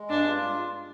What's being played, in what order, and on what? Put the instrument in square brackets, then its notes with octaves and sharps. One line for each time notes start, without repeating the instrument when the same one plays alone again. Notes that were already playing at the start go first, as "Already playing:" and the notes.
Already playing: [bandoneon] G#3
[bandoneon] G2 [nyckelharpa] D4
[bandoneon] F4